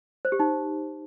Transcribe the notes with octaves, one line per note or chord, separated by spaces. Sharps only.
C5
G4
D#4